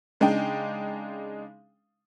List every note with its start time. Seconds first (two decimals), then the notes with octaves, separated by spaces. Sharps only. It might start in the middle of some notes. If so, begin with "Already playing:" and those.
0.20 C#3 G#3 D4 D#4 G5